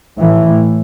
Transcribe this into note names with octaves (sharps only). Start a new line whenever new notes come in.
A2 E3